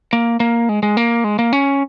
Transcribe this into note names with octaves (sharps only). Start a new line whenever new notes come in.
A#3
A#3
G#3
G#3
A#3
G#3
A#3
C#4